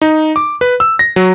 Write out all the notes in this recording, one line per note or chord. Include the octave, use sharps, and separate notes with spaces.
D#4
D6
B4
E6
A#6
F#3